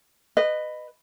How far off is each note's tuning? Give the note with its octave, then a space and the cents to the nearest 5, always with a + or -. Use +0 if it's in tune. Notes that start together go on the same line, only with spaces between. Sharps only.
B4 +10 D#5 -20